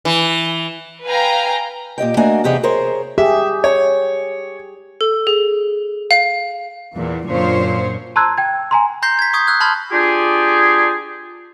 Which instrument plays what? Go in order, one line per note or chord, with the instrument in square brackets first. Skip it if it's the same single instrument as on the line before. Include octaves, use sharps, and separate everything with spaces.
[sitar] E3
[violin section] B4 F5 G5 G#5 A#5
[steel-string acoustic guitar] A#2 G4 D#5 G5
A3 A#3 D4 F#4 D#5 G#5
E2 C3 G4 G#4 D#5 F#5
G#4 A#4 C5 C#5
[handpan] G4 G#4 [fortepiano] E5
[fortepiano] C#5
[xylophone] A4
G#4
F5
[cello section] E2 A#2 E3
F#2 A#2 D3 F4 C5 C#5
[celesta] A5 A#5 C6 E6 F#6 G#6
G5 G#6
G#5 A#5 C6
[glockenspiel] A#5 C6 G6 A#6 C7 G7
G#6 B6
C#6 D#6 G6 G#6
E6 F#6 G#6
A5 B5 C6 F6 G#6 A6
[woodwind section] D4 F4 G4 G#4